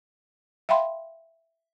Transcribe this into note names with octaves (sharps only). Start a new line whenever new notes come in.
E5 F5 G5 B5 C6